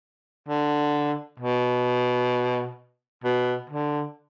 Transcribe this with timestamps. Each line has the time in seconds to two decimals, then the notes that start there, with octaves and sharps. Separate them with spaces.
0.48 D3
1.39 B2
3.24 B2
3.69 D3